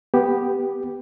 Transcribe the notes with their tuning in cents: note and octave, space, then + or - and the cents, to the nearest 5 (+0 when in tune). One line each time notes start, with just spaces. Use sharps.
B3 +0 G4 +0